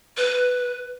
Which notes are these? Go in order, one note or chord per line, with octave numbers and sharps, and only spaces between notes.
B4